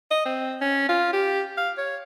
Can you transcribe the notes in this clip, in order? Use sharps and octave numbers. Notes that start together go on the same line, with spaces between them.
D#5
C4
C#4
F4
G4
F5
C#5